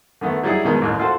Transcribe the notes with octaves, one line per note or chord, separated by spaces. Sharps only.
D3 D#3 A3 B3
F#3 G3 D#4 E4 G#4
B2 D#3 F3 G#3
A1 D#2 F#6
F4 F#4 A4 C5